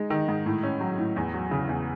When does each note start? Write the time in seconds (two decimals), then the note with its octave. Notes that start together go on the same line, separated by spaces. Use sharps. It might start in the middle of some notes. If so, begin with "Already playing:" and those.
Already playing: G#3 D#4
0.10 D#3
0.28 G#2
0.46 A2
0.63 C#4
0.80 F#3
0.98 A2
1.16 E2
1.34 F#3
1.51 C#3
1.69 E2